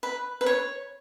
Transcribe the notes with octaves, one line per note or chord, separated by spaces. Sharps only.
B4
B4
C#5